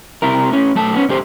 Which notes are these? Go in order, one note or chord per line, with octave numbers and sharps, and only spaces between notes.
C2 C3 E4 A#4
A2 C#4
B1 A3 A5
B3 C#4
G#2 D3 G4 C5